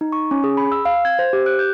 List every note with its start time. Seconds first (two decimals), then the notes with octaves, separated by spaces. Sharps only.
0.01 D#4
0.12 C#6
0.31 C#4
0.44 G#4
0.57 B5
0.72 E6
0.85 F5
1.05 G#6
1.19 C5
1.33 G4
1.46 F#6
1.59 G6